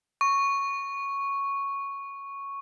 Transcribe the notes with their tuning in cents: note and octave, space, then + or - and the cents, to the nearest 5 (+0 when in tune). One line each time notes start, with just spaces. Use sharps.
C#6 +0